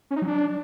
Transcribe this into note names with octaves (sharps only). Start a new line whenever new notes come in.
C#4
D#4
F#3
D4